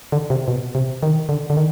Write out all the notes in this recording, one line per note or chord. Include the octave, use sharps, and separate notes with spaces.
D3
C3
B2
C3
D#3
D3
D3
D#3